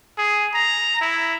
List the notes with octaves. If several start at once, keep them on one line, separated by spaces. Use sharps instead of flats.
G#4
A#5
E4